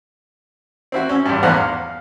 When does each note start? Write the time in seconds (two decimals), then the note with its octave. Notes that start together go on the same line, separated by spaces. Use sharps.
0.92 C4 E4 F#4
1.09 C#4 E5
1.26 G#1 G2
1.43 A#1 E2 B3 C5 F#5 A#5
1.56 F5